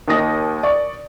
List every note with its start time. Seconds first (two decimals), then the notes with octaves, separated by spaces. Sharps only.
0.08 D#2 D#4 D#6 A#6
0.63 D5 C#6